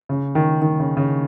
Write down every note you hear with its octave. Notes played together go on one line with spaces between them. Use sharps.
C#3
D#3
D#3
C#3
C#3